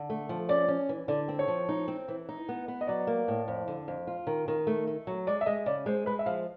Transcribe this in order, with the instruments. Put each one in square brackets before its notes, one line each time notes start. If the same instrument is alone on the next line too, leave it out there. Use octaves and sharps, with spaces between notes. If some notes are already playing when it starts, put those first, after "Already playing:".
Already playing: [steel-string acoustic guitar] D3
A3
F3
[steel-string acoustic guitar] C#4 [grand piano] D5
[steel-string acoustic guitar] C#4
E3
[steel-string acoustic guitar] D3 [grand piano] D5
[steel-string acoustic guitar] C4
[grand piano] C#5
[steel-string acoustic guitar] F3
D#4
C4
E3
D#4
B3
B3
[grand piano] D#5
[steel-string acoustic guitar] F#3 [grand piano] D5
[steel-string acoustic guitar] A#3
A2
F2
D3
F2
F4
D#3
D#3
A3
A3
F#3
[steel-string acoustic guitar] G#3 [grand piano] D5
[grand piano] E5
[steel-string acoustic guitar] G#3 [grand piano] D#5
[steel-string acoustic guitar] C#3 [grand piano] D5
[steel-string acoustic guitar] G#3 [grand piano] C5
[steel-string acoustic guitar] G#3 [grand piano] B4
[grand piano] E5
[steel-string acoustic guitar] F3 [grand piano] F5